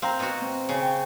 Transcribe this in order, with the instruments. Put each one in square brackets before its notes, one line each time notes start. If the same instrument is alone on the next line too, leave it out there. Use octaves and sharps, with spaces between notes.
[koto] C4 [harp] F5 A#5
[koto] B2 F#4
[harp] C4
[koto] C#3
[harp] G5 C#6